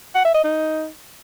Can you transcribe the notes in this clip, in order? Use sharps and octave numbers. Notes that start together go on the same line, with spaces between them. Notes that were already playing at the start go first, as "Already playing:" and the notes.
F#5
E5
D#5
D#4